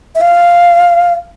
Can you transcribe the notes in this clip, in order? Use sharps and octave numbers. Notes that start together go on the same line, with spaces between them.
E5
F5